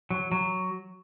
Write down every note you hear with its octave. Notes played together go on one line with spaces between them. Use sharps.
F#3
F#3